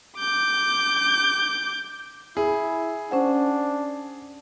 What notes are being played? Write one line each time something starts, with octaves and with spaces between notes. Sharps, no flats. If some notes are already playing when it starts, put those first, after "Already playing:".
D6 G6
E4 G#4
C#4 D4 C5 F#5